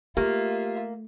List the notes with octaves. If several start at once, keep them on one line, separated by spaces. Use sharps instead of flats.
A3 A#3 F4 G4 E5